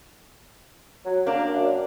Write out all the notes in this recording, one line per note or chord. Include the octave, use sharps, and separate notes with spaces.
F#3
A#3 D4 A#4
F#2